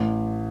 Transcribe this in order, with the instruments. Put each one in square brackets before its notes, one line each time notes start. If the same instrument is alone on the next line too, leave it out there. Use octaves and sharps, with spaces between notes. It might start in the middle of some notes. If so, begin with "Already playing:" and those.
Already playing: [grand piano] A1